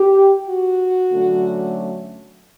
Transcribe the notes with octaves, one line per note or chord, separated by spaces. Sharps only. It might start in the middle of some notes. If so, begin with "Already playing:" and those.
Already playing: G4
F#4
D3 F#3 A3 C#4